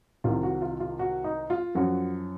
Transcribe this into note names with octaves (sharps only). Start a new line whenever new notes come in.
C2 C3 D#3 F4
F#4
F4
F4
F#4
D#4
F4
F#2 F3 F#4